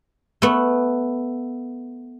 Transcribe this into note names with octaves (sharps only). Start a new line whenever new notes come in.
A3 B3